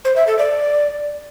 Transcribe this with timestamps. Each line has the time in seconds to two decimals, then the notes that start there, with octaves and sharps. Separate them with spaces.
0.05 C5
0.16 E5
0.27 A4
0.38 D5